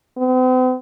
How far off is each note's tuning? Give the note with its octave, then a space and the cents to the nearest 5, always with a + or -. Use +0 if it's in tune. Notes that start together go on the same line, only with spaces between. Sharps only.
C4 -45